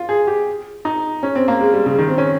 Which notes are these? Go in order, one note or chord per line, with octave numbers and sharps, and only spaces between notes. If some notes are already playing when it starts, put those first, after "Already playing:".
Already playing: F4
G#4
G4
D#4
C#4
C4
A#3
G#3
G3
C#3
D#3
C4
C#4